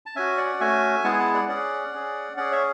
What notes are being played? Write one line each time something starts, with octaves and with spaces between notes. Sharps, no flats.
A5
C#4 F#4 E5 G#5
D5 F#5
A3 C#4 F#4 E5 G#5
G#3 B3 E4 G#4 F#5 A5
G#5
F#5 A5
D5 F#5
C#4 G#4 D5 F#5
C#4 G#4
C#4 G#4 D5 F#5
C#5 E5